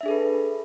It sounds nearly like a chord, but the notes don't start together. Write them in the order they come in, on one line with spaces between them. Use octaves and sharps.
E5 D4 G#4 A4 B4